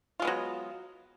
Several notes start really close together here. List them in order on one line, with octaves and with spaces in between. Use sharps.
F4 G#3 B3 F#3